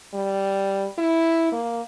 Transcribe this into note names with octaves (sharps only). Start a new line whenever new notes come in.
G3
E4
A#3